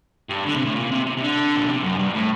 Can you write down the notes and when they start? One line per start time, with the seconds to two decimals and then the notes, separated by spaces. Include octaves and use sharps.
0.29 G2
0.45 D3
0.55 C3
0.65 A2
0.75 A#2
0.91 C3
1.06 C3
1.17 C3
1.22 D3
1.56 A#2
1.67 C3
1.84 F#2
1.99 G2
2.14 A2